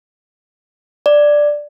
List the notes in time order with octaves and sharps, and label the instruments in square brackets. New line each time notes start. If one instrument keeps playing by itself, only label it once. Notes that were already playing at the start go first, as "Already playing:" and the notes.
[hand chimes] D5